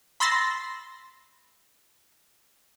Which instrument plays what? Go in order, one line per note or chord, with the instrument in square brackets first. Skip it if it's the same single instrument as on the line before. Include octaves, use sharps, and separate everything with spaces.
[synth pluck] B5 C6 E6 A6 A#6 C7